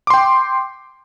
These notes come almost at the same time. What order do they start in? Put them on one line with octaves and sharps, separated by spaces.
D6 C6 G5